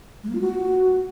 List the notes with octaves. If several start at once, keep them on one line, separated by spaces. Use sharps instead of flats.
G#3
A#3
F4
F#4